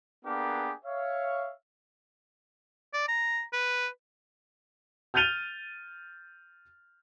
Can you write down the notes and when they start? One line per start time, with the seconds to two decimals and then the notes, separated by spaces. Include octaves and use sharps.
0.25 A#3 B3 D4 G4 G#4 A#4
0.84 C#5 E5 F5
2.93 D5
3.08 A#5
3.53 B4
5.14 F6 G6 A6 D#7 F7 G7